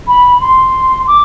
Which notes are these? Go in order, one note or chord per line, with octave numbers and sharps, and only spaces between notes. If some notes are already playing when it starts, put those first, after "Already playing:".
B5
C6
D6